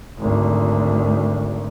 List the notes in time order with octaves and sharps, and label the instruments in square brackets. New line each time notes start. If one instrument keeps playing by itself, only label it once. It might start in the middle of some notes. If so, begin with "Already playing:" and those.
[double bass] G#1 D2